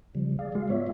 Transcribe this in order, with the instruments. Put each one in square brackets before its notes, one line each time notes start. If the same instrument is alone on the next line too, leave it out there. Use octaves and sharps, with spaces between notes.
[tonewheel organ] C#3 F3 G3
[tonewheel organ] G#4 D5 [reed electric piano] F5
[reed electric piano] G#3 F#4 [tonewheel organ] F5
[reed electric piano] G#2 C#5 D5 [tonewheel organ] B3 F4 E5